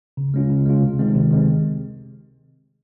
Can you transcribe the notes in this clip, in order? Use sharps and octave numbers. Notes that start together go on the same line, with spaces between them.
C#3
G#3 C#4 F4
C#3
G#3 C#4 F4
C3
D#3 G#3 C4
C3
D#3 G#3 C4